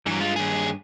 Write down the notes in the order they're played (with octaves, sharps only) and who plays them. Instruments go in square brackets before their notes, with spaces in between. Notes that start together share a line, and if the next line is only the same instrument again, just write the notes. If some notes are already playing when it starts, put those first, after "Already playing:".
[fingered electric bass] G2 [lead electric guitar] E3 F#3
[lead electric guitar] G#3 F4
D#2 G#4